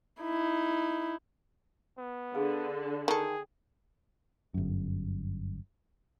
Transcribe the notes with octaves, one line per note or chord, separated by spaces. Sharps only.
D#4 E4
B3
D3 G#4 F5
D#3 G#4 A4 G5 G#5
G1 F#2